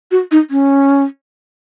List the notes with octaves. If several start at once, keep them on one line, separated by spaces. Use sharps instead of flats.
F#4
D#4
C#4